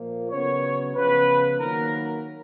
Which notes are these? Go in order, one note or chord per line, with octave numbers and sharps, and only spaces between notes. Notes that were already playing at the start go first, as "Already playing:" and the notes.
Already playing: A#2 F3 A#3
C#3 F#3 B3 C#5
C#3 F3 B3 B4
D#3 F#3 A#3 A#4